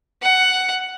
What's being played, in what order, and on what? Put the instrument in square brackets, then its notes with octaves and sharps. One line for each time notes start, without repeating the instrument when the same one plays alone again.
[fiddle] F#5